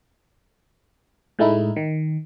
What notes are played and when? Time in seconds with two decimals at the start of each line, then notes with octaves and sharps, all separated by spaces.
1.39 A2 G#3 A3 D#4 E4
1.76 D#3